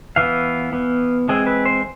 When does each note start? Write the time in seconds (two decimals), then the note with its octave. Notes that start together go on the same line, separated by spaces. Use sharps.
0.16 E3 B3 F5
0.73 E3 B3
1.28 E3 G#3 C4 G#4
1.47 B4
1.65 C5